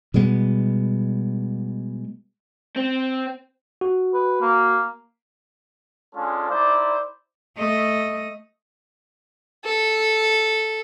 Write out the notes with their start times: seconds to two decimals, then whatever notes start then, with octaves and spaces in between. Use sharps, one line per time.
0.14 B2 G3 G#3 B3
2.76 C4
3.81 F#4
4.14 B4
4.41 A#3
6.16 G#3 C#4 D4 F4 A4
6.51 D#4 E4 C5 D5
7.57 A3 D#5
9.65 A4